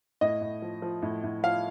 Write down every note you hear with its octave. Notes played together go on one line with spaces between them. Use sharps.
A2 D#5
A2
F3
F3
A2
A2
F3 F5